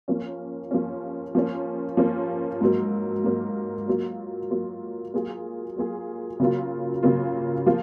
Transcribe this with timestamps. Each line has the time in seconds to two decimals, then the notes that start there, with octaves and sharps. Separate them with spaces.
0.08 F3 A#3 C#4
0.71 F3 A#3 C#4
1.35 F3 A#3 C#4
1.97 F3 A#3 C#4
2.61 G#2 F#3 A#3
3.24 G#2 F#3 A#3
3.88 F#3 A#3 F4
4.50 F#3 A#3 F4
5.13 F#3 A#3 F4 G#4
5.76 F#3 A#3 F4 G#4
6.40 C#3 F#3 A#3 F4
7.03 C#3 F#3 A#3 F4
7.66 F3 A#3 F4